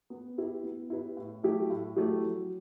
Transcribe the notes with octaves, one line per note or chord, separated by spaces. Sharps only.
B3
E4 G4 B4
B3
E4 G4 B4
A2
F#3 A3 E4 G4
A2
F#3 A3 E4 G4
F#3